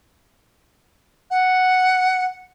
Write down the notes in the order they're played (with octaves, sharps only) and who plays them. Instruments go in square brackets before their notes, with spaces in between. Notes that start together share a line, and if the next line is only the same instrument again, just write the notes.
[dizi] F#5